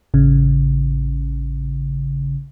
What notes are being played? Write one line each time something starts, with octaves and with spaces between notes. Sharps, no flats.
A1 C#3